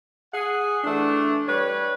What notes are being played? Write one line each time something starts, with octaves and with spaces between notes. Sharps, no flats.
G#4 F#5
E3 A3 D4
G3 B4 C#5